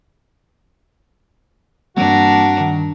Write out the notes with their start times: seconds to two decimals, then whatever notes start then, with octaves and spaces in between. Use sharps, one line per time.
1.97 G2 E3 G3 A#3 C4 D4 F#4 A#4
2.60 D#3